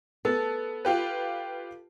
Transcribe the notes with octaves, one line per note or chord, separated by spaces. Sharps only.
B3 A4
F4 G4 B4